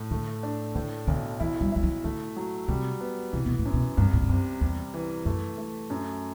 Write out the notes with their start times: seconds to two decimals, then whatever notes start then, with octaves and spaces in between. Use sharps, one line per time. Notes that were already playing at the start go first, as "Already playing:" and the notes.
Already playing: A2
0.11 D3 A3
0.43 D4
0.75 A2 D3
1.07 B1 D3
1.40 E3 E4
1.61 G3
1.72 G3 E4
1.83 F#3
2.04 D3 A3
2.36 F#3
2.68 C3 G3
3.01 B3
3.33 C3 E3
3.46 B2
3.59 A2
3.65 F#2
3.74 B2
3.97 C2 G2
4.13 A2
4.22 G2
4.29 F#2 C3
4.61 E2 G3
4.94 E3
5.25 F#2 A3
5.58 A3
5.90 F#2